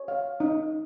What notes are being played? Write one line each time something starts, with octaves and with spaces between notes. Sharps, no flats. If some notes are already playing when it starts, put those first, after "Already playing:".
Already playing: C#5
F5
D#4